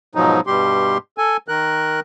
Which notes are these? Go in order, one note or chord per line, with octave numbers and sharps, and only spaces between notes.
G#2 B2 F3 F#3 D#4
G2 B2 G3 G4 C6
A4 G#5
D#3 A#4 F#6